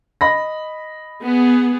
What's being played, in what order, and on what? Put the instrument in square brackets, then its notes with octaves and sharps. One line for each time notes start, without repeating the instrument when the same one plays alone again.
[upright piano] D#5 B5 A#6
[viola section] B3 G#4